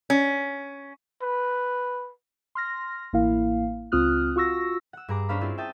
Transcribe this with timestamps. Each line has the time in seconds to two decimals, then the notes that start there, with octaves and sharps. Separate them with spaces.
0.10 C#4
1.22 B4
2.55 C6 F6 A#6
3.13 A1 A#3 E4 F5
3.92 C#2 C4 F4 D#6 F6 F#6
4.36 F4 F#4 C#6 E6 A#6
4.93 F#5 E6
5.08 G2 G#4 A#5 D6
5.29 C#4 D4 C5 F5 B5
5.41 C4 C#4 E4 F4 G#4 C5
5.58 E5 G5 A5 D#6